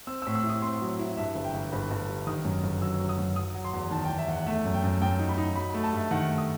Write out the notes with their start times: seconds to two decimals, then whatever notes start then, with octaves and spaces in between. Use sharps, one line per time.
0.07 C4 E6
0.22 E6
0.27 A2
0.35 E6
0.44 E4
0.49 D#6
0.62 C4 C6
0.81 F#3
0.99 E4
1.17 G2 E5
1.35 G1
1.45 G5
1.54 G1
1.72 G1 B5
1.91 G1
2.09 G3
2.27 D#3 D#6
2.45 F#2
2.63 G1
2.81 F#3 E6
3.00 F#2
3.09 D#6
3.18 F#2
3.36 F#3 D#6
3.54 F#3
3.65 C6
3.73 E2
3.91 D#3 A5
4.05 E2 G5
4.18 E5
4.28 E2 F#5
4.46 A3 E5
4.65 F#2
4.74 G5
4.84 F#2
5.02 F#2 G5
5.19 D#4
5.29 B5
5.38 D#4
5.55 F#3 B5
5.70 A3 B5
5.84 A5
5.92 G2
5.97 E5
6.11 D#3 F#5
6.29 A3
6.38 D#6